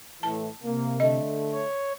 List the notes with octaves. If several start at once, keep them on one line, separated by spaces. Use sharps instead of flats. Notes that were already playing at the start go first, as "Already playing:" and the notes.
A2 E3 A3 A5
C3 A#3
D3 A3 D#5
C#5